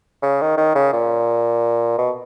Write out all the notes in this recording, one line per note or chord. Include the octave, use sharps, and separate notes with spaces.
C#3
D#3
D#3
C#3
A#2
B2